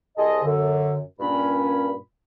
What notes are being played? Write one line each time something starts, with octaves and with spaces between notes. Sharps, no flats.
C2 G#4 A4 C5 D#5
F#2 D3
G2 A#2 C#4 B5